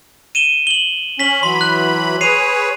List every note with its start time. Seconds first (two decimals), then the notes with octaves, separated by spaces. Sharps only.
0.35 D#7 E7 G7
0.67 F#7 G7
1.19 C#4 B6 F#7 G7
1.43 E3 F#3 B5 C6
1.61 F#6
2.21 G#4 B4 C#5 C7 D#7 F7